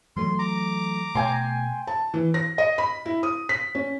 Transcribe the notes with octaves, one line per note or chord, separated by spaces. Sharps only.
E3 F#3 A3 C6
A#5 D6
B2 A3 G5 G#5 C6
A5
E3
A#6
D#5
B5
E4
D#6
B6
C#4